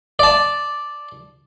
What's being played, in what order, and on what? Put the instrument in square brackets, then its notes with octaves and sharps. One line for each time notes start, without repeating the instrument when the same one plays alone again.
[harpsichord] D5 A5